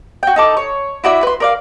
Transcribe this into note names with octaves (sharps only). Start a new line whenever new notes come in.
F#4 G5
D#4 A4 D6
C#5
E4 F#4 D5 E5
B4 C6
A#4 D5 F5